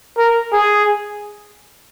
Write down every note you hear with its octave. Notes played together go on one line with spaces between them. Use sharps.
A#4
G#4